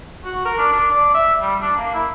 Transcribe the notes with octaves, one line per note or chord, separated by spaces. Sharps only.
F#4
A#4
D4
D4
D5
E5
G3
D4
A#3
E4